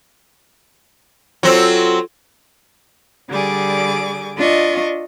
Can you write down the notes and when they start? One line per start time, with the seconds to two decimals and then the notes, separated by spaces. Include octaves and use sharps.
1.43 F#3 C4 F4 A4
3.29 D3 G3 G#4 D6
4.36 D4 F4 D#5 C#6